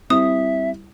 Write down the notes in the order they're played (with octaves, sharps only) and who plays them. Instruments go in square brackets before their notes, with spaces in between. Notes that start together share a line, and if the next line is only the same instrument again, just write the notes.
[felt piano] G3 E4 [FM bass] C4 [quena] E5 [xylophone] D#6